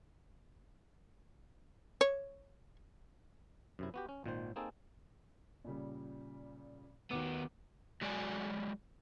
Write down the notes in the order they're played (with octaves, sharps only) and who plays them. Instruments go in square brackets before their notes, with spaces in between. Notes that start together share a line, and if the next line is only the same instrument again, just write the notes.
[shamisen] C#5
[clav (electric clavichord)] F#2 C3 E4
B3 F#4 G4
C#4
G#1 A#2 D#3 C5
A#3 C4 D#4 G#4 A4
[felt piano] A#2 C#3 G3
[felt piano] D#2 F#4 D6 [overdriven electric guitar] D#3 B3
[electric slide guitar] F#3 G#3 F#4 D5 G#5